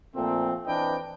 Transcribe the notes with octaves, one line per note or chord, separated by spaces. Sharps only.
A#2 F3 A3 C4
E3 C4 D4 B4 D#5 G5